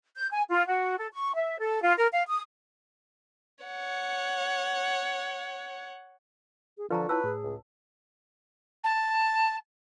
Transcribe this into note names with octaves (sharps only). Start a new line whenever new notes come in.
G6
G#5
F4
F#4
A4
C#6
E5
A4
F4
A#4
F5
D#6
C#5 F#5
G#4
D3 F3 F4 B4 A5 A#5 C#6
E4 B4 C#5 A5 E6
A2 G#4
C#2
A5